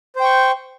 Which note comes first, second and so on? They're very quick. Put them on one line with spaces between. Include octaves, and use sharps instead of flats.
C5 G5 C#6